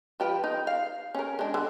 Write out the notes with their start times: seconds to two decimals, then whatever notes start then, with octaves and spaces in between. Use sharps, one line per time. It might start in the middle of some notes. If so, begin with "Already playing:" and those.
0.20 F3 G4 B4
0.44 D#4
0.67 F5
1.15 C#4 A#4
1.39 G#3 D4
1.54 D3